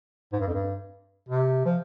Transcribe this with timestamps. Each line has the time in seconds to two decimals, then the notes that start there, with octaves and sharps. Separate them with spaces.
0.32 G#2
0.40 G2
0.47 F2
0.54 G2
1.29 C3
1.65 F3